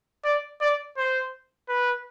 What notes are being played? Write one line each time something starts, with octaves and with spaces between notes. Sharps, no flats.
D5
D5
C5
B4